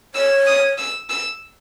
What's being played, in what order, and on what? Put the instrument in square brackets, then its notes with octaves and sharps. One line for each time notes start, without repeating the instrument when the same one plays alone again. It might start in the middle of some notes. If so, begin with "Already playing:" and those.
[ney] C#5 [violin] E6
[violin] D#6
E6
E6